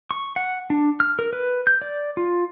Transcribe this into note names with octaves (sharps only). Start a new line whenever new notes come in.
C#6
F#5
D4
F6
A#4
B4
G6
D5
F4